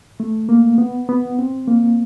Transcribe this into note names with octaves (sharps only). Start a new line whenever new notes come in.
A3
A#3
B3
B3
C4
A#3